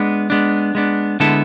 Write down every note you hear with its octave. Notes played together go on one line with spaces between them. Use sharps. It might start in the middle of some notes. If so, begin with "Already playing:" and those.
Already playing: G#3 B3 D4
G#3 B3 D4
G#3 B3 D4
D3 G#3 B3 E4 A4